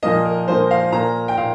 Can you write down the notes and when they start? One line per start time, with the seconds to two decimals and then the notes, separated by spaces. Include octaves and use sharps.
0.03 A#2 F3 A#3 D#5
0.25 A#4
0.48 A#2 F3 A#3 C5
0.71 F5
0.92 A#2 A#3 A#5
1.28 G5
1.38 A#2 F5